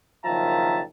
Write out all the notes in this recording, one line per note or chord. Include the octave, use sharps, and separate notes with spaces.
F#1 D#3 F3 E5 A5 A#5